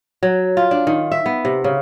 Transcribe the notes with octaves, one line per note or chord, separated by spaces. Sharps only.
F#3
F4
D4
D#3
E5
B3
C3
C#3